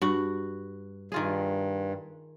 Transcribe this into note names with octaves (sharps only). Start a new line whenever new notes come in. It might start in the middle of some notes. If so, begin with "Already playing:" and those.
G2 F#4
G2 D#3 F4 G#4